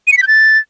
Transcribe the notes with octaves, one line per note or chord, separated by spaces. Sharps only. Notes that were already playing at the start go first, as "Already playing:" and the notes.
D#7
C#7
B6
G6
A6